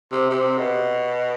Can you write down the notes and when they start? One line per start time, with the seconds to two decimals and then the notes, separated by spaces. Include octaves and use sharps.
0.12 C3
0.30 C3
0.58 B2